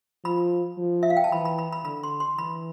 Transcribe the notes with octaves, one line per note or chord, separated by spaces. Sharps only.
F3 B5
F3
E5
F5
G5
A5
E3 B5
B5
B5
B5
D3 B5
C6
C6
E3 B5